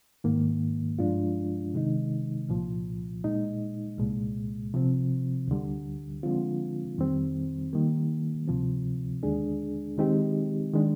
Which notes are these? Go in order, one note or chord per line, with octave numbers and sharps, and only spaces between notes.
G#2 D#3 A#3
G2 F3 G#3 D4 F4
C3 D#3 G#3 D#4
C2 A#2 F3
A#2 G#3 D#4
C2 A#2 G#3
C3 F3 C4
D2 D3 G3
D3 F3 G#3 C4 F4
F2 D#3 G3 C4
D#3 G3 A#3
D2 C3 F3 C4
D#2 D3 G#3 D4 G#4
D#3 G#3 C4 D#4 G4
D#3 G#3 D4